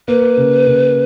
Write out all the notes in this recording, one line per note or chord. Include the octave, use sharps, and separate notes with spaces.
A#3 B4
C#3
C#3